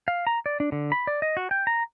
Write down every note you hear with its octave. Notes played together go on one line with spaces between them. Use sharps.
F5
A#5
D5
D4
D3
B5
D5
D#5
F#4
G5
A#5